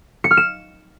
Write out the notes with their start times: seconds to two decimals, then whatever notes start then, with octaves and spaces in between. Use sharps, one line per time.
0.24 C#7
0.31 F6
0.37 E7